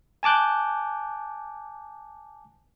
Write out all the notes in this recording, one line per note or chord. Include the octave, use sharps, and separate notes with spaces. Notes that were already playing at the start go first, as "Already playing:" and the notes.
G#5 A5 D6 F#6 G6